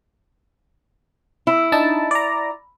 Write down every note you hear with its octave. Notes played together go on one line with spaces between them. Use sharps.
E4
D4 D#4 A5
D5 A#5